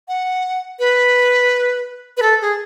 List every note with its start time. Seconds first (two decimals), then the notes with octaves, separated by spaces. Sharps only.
0.08 F#5
0.79 B4
2.17 B4
2.22 A4
2.41 G#4